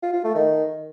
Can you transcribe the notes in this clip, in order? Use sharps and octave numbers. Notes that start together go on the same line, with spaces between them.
F4
F4
A3
D#3